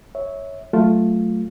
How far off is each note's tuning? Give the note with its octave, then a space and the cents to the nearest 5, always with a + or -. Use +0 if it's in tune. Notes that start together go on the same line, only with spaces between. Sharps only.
C#5 +0 E5 -20
F#3 +10 A3 +0 F4 +0